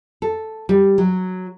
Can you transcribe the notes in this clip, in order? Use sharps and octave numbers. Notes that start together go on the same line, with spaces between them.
A4
G3
F#3